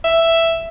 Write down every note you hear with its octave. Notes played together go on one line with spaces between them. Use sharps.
E5